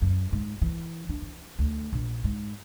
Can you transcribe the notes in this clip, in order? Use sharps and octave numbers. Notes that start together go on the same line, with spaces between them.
F#2
G#2
E3
D4
E3
D2
A#1
G#2